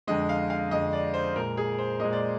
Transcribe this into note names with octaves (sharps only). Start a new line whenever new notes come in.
F2 D3 G#3 D#5
F5
F5
F2 D3 G#3 D#5
D5
C5
A#2 G#3 A#4
G#4
C5
A#2 G#3 D#5
D5